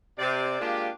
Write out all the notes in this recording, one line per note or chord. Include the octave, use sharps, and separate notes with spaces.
C3 D5
G#3 A#3 D4 F4 G4